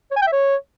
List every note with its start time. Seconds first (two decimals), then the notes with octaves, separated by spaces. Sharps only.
0.11 C#5
0.16 G#5
0.22 G5
0.27 E5
0.32 C#5